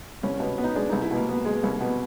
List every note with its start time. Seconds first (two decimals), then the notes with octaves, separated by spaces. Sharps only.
0.23 C2 C#4
0.40 B2
0.58 B3
0.64 D#4
0.75 G#3 D4
0.89 C2 D#4
1.02 E4
1.11 B2 A#3
1.29 B3
1.45 G#3
1.63 C2
1.80 B2 B3